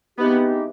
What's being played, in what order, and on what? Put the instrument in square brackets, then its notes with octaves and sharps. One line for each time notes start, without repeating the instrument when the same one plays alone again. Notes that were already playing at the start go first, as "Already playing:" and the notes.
[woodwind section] E3 G#3 C4 D#4 G4 [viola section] B3